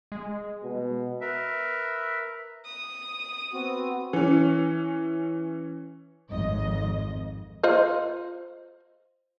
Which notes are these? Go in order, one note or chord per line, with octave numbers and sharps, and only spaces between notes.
G#3
B2
A#4 B4 E5
D#6
B3 C4 F#4
E3 C#4
G#1 F2 D#5
F4 C5 D#5